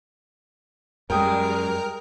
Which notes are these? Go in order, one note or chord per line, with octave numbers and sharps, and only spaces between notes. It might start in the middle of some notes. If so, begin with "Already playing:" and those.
F#2 G3 G#3 A#4 G5 D#6